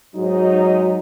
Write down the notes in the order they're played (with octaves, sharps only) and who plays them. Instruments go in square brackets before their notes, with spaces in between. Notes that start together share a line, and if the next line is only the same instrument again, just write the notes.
[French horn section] G#2 D#4 [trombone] F#3